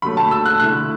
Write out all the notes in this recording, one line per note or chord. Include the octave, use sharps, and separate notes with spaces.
D3 F#3 A3 B5
A5
E6
F#6
D3 A3 E4 F#6